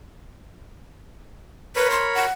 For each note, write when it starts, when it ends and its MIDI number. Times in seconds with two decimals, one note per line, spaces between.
1.76 2.26 70
1.76 1.88 71
1.76 2.26 73
1.76 2.26 83
1.91 2.06 84
2.15 2.33 78